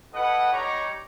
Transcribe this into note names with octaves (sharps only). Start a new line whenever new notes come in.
E4 A4 B4 D#5 F#5
G3 D#4 G4 C#5 A#5 D6